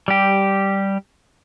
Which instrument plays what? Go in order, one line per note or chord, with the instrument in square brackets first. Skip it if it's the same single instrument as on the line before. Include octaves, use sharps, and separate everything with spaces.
[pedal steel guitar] G3 G4